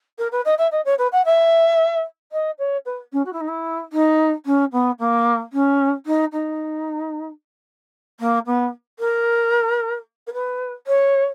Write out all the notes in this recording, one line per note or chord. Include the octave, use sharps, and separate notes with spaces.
A#4
B4
D#5
E5
D#5
C#5
B4
F#5
E5
D#5
C#5
B4
C#4
F#4
E4
D#4
E4
D#4
C#4
B3
A#3
C#4
D#4
D#4
A#3
B3
A#4
A#4
B4
C#5